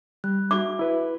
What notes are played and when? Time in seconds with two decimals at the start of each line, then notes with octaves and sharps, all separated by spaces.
0.24 G3 F#6
0.51 F#4 G#4 E5 D6
0.79 E4 B4